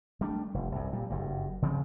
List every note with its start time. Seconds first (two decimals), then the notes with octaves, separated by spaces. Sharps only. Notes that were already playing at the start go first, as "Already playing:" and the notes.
0.21 G3 A3 D4
0.54 F1
0.72 C2 F#2
0.93 A#2 G3
1.10 F#1 G2
1.62 C#3 F3 C4